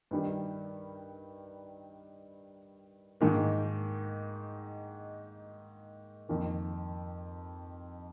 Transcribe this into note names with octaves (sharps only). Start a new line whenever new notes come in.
G2 D#3 G3
G#2 D#3 A#3
F2 D#3 A#3